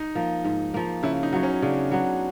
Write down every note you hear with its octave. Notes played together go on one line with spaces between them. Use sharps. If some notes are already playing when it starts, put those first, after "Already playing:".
Already playing: D#4
F3 A#3
G#2
F3 A#3
C#3 E4
D#4
F#3 B3
C#4
C#3 D4
F#3 B3